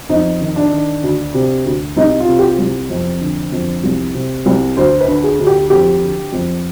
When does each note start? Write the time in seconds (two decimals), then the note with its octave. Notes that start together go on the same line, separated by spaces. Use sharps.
0.09 F2 D#4
0.41 D#3
0.56 D4
0.72 D#3
1.03 D2
1.34 C3
1.65 D2
1.97 C2 D#4
2.20 F4
2.28 C3
2.39 G4
2.43 F4
2.59 C2
2.90 F2
3.21 D3
3.52 F2
3.84 C2
4.15 C3
4.46 C2
4.77 D2 C5
5.01 B4
5.08 D3
5.24 G#4
5.39 D2
5.47 G4
5.70 F2 G4
6.02 D3
6.33 F2